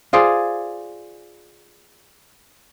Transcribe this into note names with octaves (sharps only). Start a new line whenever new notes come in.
F4 G#4 C5 D5